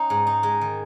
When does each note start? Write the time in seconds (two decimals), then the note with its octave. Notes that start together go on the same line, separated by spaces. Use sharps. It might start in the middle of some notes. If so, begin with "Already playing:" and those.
Already playing: C#4 D#4
0.10 G#2
0.27 D#4
0.43 G#3
0.61 D#3